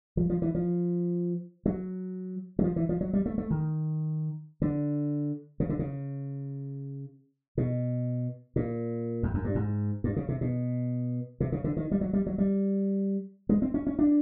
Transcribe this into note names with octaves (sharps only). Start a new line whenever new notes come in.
F3
F3
E3
F3
F#3
F#3
F3
E3
F3
F#3
G3
A3
A3
D#3
D3
C#3
D3
C#3
B2
A#2
F2
F#2
G2
G#2
G2
C#3
C3
B2
C3
C#3
D3
D#3
G3
F#3
G3
F#3
G3
G#3
C4
C#4
C#4
D4